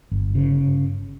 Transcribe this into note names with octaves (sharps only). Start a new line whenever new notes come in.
G1
C#3